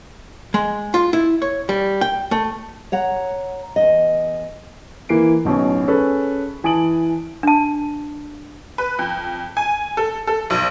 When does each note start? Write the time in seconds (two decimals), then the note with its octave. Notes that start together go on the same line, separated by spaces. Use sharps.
0.54 G#3
0.94 F4
1.13 E4
1.42 C#5
1.69 G3
2.01 G5
2.31 A3
2.92 C#5 F#5 A#5
3.76 E2 D#5
5.09 E3 A#3 C7 D7
5.45 D1 B1 B2 C#4
5.88 C#4 G#4 A4 B4
6.64 E3 G#5 A5 D#6 D7 F#7
7.43 D4 A5
8.78 B4
8.99 F2
9.57 G#5
9.97 A4
10.27 A4
10.50 B1